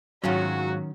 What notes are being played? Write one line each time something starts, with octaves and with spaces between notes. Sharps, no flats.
G#2 D#3 F#3 C#4 F4 F#4